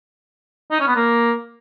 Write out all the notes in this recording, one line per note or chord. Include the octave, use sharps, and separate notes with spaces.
D#4
C#4
B3
A#3